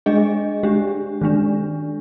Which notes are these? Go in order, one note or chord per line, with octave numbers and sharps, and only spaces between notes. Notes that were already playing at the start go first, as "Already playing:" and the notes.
G#3 D4 G#4 D#5
G#3 D4 G4
D#3 G#3 D4